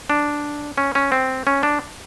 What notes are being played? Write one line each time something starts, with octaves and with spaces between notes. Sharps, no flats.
D4
C#4
C#4
C4
C#4
D4